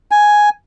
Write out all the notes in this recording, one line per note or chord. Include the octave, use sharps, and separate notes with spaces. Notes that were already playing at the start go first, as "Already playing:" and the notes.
G#5